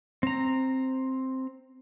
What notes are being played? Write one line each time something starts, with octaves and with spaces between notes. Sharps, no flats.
C4 A#5